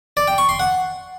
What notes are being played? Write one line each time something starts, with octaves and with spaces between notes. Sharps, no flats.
D5
G5
C#6
C6
F#5